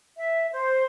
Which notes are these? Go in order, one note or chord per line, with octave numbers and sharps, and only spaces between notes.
E5
C5